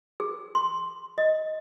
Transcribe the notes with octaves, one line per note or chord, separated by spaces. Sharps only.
G#4
C6
D#5